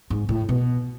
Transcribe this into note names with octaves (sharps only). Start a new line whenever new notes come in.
G#2
A2
B2